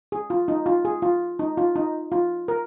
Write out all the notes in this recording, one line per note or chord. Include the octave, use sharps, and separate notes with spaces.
G#4
F4
D#4
F4
G#4
F4
D#4
F4
D#4
F4
A#4